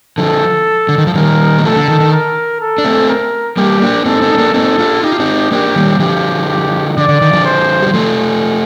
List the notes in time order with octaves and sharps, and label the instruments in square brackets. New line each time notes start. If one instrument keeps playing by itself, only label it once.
[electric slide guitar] D3 F3 [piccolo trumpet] A4
[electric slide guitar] D3
D#3
F3
[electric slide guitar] D#3 G3 [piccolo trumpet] A#4
[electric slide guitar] A#3
[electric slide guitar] F3 A3 [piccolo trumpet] A4
[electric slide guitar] D3
D#3
D#3
[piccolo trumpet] A#4
A4
[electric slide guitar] D4
A3 C4
[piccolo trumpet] A#4
[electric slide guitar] G3 A#3 [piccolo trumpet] G4
[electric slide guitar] A#3 D4
[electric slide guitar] C4 D#4 [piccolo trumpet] A4
[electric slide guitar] C4 D#4
C4
A#3 D4
[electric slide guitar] C4 D#4 [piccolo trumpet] A4
[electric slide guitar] D4 F4
[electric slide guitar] D#4 [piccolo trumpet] G4
[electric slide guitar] F4
C4 D#4
[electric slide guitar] A#3 D4 [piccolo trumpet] G4
[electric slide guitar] D#3 G3
[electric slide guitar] D3 F3 [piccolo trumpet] G4
[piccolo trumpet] G4
[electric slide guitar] D3 [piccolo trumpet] D5
[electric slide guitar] D3
D#3
D3 F3
[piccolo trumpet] C5
[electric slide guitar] G3
F3 A3